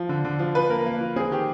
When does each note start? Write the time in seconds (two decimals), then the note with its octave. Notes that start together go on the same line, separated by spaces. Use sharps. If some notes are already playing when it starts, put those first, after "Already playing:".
Already playing: F3
0.09 D3
0.25 D3
0.39 F3
0.55 F3 B4
0.70 A#3 A#4
0.86 A#3
1.01 F3
1.16 C4 G#4
1.31 D#3 G4